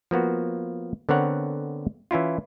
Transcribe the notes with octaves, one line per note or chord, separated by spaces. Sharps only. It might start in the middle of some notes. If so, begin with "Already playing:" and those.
F3 A#3 B3 F#4
D3 B3 C4 A#4 C#5 F#5
E3 C#4 E4 F4